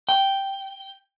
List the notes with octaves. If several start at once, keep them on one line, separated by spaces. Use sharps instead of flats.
G5